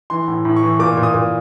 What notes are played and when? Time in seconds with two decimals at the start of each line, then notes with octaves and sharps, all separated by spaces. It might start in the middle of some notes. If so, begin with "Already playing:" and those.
0.10 E3 C6
0.28 A2
0.45 A2
0.56 C#6
0.63 E3
0.79 A#2 D6
0.97 A#2
1.03 D#6
1.14 A#2